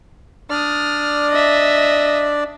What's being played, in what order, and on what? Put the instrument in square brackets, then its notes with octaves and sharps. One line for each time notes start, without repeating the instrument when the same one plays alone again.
[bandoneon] D4 D5 [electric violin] D#6 F6
[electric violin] D#5 E5